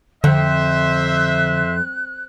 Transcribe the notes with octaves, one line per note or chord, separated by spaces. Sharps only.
F2 D3 C5 E5 F#6